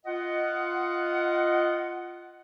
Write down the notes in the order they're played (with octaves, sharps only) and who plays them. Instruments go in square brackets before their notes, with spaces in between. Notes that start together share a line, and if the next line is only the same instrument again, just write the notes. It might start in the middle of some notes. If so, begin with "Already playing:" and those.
[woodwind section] F4 D#5 F#5